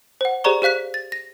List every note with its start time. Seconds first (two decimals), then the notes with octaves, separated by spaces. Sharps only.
0.21 C5 F#5
0.44 G4 G#4 C5 D5 A#5 C#6
0.62 G4 C5 F5 F#6 B6
0.94 A6
1.12 A#6